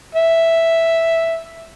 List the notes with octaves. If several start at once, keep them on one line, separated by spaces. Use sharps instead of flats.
E5